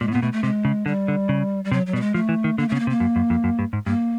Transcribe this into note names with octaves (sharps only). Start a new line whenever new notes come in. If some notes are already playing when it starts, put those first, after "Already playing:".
A#2 G#3
A2
A#2 B3
B2 A3
A3
C3 G#3
C#3
D3 G3
D3
C#3
G3
C3 F#3
F#3
B2 G3
G#3
F3 A3
E3
D#3
D3 A#3
C#3 A3
B3
A#3
C3
A#3
F#2
F#2
F2
F#2
G2
G#2
G2 A#3